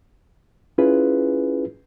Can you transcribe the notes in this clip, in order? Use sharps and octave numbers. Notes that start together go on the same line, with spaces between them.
C#4 E4 F4 G#4 B4